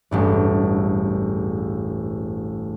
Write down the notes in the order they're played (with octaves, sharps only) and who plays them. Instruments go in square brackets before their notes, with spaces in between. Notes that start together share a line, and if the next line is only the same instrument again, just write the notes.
[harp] E1 A1 G2